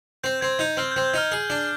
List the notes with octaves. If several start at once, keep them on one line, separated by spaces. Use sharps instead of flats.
C4 G6
C4 G#6
D#4 G6
C4 F6
G6
C4
G6
D#4 F6
G#4
D4